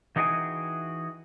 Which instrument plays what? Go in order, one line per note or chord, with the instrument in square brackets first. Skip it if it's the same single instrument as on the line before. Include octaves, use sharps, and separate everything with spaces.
[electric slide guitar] E3 D#4 F#4 G#4 G5 G#5